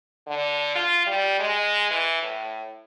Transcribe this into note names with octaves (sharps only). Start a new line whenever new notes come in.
D3
F4
G3
G#3
E3
A2